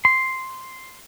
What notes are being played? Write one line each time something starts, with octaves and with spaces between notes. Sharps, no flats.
C6